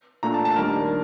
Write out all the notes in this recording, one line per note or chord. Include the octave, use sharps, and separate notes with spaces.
A#2 A3 D4 A#5
A5
A5
D#2 D#3 G3 D4 A#4